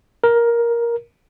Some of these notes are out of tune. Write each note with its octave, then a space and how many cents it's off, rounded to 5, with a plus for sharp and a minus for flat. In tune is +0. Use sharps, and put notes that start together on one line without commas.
A#4 +10